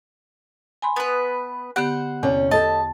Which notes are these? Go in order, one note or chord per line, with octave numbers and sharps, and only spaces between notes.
G#5 B5 C6
B3 B4
D3 B3 G4 C5 F#5
E2 C3 C#4 D5
G4 A4 D#5 A5